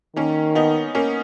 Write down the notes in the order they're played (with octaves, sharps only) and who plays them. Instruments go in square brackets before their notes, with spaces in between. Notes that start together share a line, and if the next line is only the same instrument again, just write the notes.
[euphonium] D#3 [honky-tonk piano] A#3 C#4
[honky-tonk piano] B3 D#4
A#3 C#4